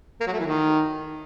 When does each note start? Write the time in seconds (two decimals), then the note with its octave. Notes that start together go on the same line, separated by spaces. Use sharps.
0.20 A#3
0.27 F#3
0.33 A3
0.40 E3
0.46 D#3